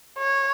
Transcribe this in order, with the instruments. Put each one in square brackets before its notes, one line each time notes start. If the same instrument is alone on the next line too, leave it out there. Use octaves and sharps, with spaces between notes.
[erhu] C#5